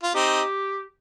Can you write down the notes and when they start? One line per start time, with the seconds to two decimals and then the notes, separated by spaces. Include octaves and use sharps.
0.03 F4
0.14 C4 D#4 G4